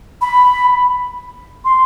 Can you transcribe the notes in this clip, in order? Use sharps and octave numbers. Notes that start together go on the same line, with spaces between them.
B5
C6